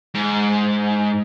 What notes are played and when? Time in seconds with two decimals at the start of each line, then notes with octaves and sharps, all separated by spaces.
0.15 G#2